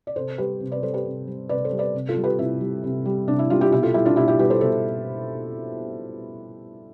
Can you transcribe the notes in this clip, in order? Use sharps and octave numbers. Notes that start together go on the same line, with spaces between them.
D5
C3 A4 C5
G3 G4 B4
C3
B4 D5
G3 A4 C5
G4 B4
C3
G3
C3 B4 D5
A4 C5
G3
B4 D5
C3
F4 A4
G3
G4 B4
C3 E4
G3
C3
G3
C3 D4
E4
G3 D4 F4
E4 G4
B2 E4 G4
F4 A4
G3 E4 G4
D4 F4
B2 E4 G4
E4 G4
G3 G4 B4
A4 C5
B2 A4 C5